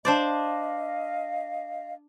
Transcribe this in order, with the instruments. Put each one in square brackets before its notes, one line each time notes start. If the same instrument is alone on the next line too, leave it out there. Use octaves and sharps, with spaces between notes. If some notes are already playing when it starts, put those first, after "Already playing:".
[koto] D4 C5 D5 [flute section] D#5 F5